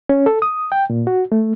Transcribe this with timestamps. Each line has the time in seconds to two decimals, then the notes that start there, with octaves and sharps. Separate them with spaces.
0.09 C#4
0.26 A4
0.42 D#6
0.72 G5
0.90 A#2
1.07 F#4
1.32 A3